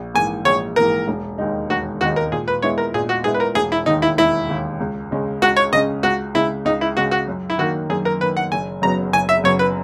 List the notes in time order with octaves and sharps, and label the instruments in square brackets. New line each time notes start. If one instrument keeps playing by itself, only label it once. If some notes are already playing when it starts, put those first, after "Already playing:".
Already playing: [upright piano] A#1
[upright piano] G#2 E3 A#3 [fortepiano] G#5
[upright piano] A#1 [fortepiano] C#5
[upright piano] G#2 E3 A#3 [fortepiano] A#4
[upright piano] E1
D#2 D#3 G#3 D#4
[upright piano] E1 [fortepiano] F#4
[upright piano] D#2 D#3 G#3 D#4 [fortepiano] F#4
[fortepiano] A#4
[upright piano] A#2 [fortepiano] G#4
[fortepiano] B4
[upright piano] G#3 B3 E4 [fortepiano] C#5
[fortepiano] A#4
[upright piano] A#2 [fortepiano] G#4
[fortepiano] F#4
[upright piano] G#3 B3 E4 [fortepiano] G#4
[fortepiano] B4
A#4
[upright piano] E1 [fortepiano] G#4
[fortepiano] E4
[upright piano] D#2 D#3 [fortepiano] D#4
[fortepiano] E4
[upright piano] E1 [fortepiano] E4
[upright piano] D#2 D#3
C#2
C#3 G#3 C#4
[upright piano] C#2 [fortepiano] F#4
[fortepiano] C#5
[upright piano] C#3 G#3 C#4 [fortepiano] D#5
[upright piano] C#2 [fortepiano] F#4
[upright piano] C#3 G#3 [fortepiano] E4
[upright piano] C#2 [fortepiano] D#4
[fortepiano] E4
[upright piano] C#3 G#3 [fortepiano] F#4
[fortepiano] F#4
[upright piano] F#2
[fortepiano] E4
[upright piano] D#3 A#3 [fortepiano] F#4
[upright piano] F#2 [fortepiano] G#4
[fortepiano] A#4
[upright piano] D#3 A#3 [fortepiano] B4
[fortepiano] F#5
[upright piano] F#1 [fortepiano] G#5
[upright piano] F#2 C#3 F#3 B3 [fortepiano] A#5
[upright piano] F#1 [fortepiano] G#5
[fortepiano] E5
[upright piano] F#2 C#3 F#3 B3 [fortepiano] C#5
[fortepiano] B4